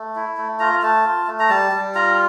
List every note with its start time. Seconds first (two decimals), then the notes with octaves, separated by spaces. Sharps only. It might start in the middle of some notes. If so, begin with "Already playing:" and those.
Already playing: A3
0.16 E4
0.37 A3
0.59 F4 A#5
0.82 A3 A5
1.05 F4
1.27 A3
1.39 A#5
1.49 G3 A5
1.72 G3
1.95 F4 A#5